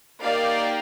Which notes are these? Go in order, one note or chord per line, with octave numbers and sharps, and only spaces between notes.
A#3 D#4 G4 D5 F5